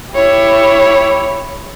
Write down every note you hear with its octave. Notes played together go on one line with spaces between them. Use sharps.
E4 G4 C#5